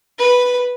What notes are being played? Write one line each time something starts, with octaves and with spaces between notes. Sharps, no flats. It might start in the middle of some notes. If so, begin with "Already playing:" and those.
B4